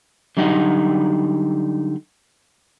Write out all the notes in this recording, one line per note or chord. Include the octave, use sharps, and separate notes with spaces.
D3 F#3 G3 D#4 F#4